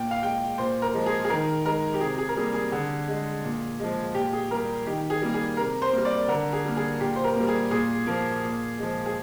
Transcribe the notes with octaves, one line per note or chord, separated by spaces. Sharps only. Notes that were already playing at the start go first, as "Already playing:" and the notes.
Already playing: A#2 G5
F5
G#3 G5
A#2 C5
A#4
F3 G#3
G#4
G#4
D#3 A#4
G#3 A#4
G4
C3 G#4
G#4
A#4
G3 A#3 G#4
G#4
D3 G#4
G#3
A#2
F3 G#3
A#2 G4
G#4
G3 A#3 A#4
D#3 G4
G#4
G3 A#3
G#4
C3 A#4
C5
G3 A#3
D5
D3 A#4
G#4
G3 A#3
G#4
A#2 G4
C5
A#4
G3 A#3
G#4
A#2 G#4
F3 A#3
A#2
F3 G#3
G#4